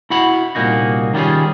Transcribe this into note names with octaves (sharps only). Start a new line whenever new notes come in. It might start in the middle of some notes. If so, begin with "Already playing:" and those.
E4 F#4 F#5 B5
C2 A#2 A#3 D#4 F#4
D#3 G3 C#4 D4 F4 G#4